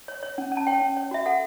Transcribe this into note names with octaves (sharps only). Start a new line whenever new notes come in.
C#5
C#5
C#4
C#4
A5
C#5 G5
C#4
C#5
F#4 E5
A4 F#5